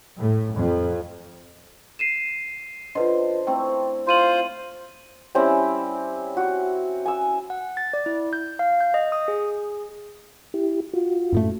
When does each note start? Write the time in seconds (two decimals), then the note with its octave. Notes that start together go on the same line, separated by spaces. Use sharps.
0.19 A2
0.54 F2
1.99 C7 D#7 E7
2.95 D3 F4 B4 C5 D#5
3.47 A3 C4 E4 G5
4.07 F4 C5 C6 D#7 F#7
5.35 G3 C4 C#4 E4
6.37 F#4
7.06 G#5 E6
7.50 F#5
7.77 A6
7.93 D5
8.06 E4
8.33 G6
8.59 F5
8.80 G6
8.94 D#5
9.12 D#6
9.28 G#4
10.54 E4 G4
10.94 F4 F#4
11.32 F#2 A2 A3